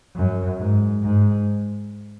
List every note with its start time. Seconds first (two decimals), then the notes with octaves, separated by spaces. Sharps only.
0.16 F#2
0.59 G#2
1.03 G#2